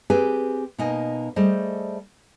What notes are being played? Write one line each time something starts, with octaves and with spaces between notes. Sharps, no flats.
C4 G4 G#4 B4 G#5
B2 A#3 D#4 D#5 G#5
G3 A3 G#4 C5 D#5